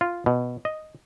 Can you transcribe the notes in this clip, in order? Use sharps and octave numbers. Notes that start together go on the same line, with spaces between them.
F4
B2
D#5